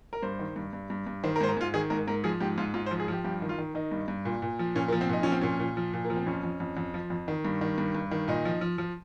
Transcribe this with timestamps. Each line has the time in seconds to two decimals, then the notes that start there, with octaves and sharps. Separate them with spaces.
0.13 A#4
0.23 G2 C5
0.39 D#3
0.56 G2
0.73 G2
0.90 G2
1.07 G2
1.23 D#3 C5
1.36 A#4
1.41 G#2 C5
1.48 A#4
1.57 G#2 F4
1.74 D#3 G#4
1.90 G#2 A#4
2.07 G#2 A#4
2.24 F3 G#4
2.40 G#2 G4
2.58 G#2 F4
2.74 G#2 F4
2.86 C5
2.91 F3
3.00 G#4
3.08 F3 G4
3.24 G2 G4
3.42 D#3
3.49 F4
3.58 D#3
3.75 D#3 D#4
3.92 G2
4.08 G2
4.25 A#2
4.42 A#2
4.59 F3
4.75 A#2 C#4
4.88 A#3
4.92 F3
5.01 C4
5.09 A#2 D#4
5.23 F3 C#4
5.32 C4
5.41 A#2 C#4
5.60 A#2
5.77 F3
5.93 A#2
6.05 A#3
6.10 F3
6.16 C4
6.26 F2 C#4
6.43 F2
6.60 F2
6.77 F2
6.94 F3
7.10 F2
7.28 D#3
7.45 G2
7.61 D#3
7.78 G2
7.95 G2
8.11 D#3
8.28 A#2 D#4
8.45 F3
8.61 F3
8.78 F3